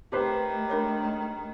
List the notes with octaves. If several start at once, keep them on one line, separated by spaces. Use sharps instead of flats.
D#3 A3 G4 B4 C5
D4 A#4 C#5